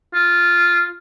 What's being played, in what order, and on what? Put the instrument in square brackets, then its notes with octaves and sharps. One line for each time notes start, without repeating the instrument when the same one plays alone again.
[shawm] F4